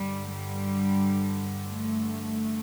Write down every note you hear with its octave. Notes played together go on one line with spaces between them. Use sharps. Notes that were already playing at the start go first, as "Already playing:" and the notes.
Already playing: G2 D3 G3
G3
A3